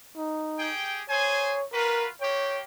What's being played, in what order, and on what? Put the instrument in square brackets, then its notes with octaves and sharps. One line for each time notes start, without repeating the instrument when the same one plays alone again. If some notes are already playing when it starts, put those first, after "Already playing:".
[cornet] D#4
[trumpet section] G4 G#4 G5
[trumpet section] G#4 C5 G#5 [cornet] C#5
[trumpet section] F4 F#4 B4 [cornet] A#4
[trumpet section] A#3 G4 G5 [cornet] C#5